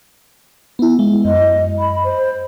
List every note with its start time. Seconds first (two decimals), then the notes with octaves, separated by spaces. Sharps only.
0.79 B3 E4
0.99 G#3
1.25 F#2 D#5
1.79 B5
2.04 C5